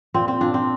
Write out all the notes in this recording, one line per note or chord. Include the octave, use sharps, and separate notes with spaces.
A#2 C4
C4
A#2 D4
C4